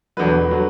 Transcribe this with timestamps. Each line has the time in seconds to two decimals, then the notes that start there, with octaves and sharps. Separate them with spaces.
0.17 E1 E2 D3 F#3 B4
0.51 D3 F#3